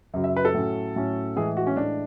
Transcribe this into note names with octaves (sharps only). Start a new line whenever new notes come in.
F#2 C#3 F#3
E5
B4
A4
A2 F#3 C#4
A2 F#3 C#4
A2 E3 G#3 G#4
F#4
C#4
A2 E3 G#3 D4